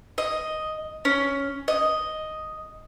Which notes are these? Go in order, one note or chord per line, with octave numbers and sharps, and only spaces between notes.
D#5
C#4
D#5